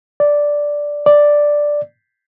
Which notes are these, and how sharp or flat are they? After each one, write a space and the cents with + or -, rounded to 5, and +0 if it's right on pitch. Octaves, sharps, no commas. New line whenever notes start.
D5 -5
D5 +0